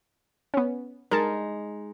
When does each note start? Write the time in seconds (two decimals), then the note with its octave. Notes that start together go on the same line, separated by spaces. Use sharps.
0.54 B3 C#4
1.11 G#3 D#4 A#4 A5